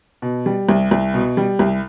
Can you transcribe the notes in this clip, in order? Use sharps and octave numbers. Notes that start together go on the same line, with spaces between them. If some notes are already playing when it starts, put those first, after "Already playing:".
B2
G3
C2
C2
B2
G3
C2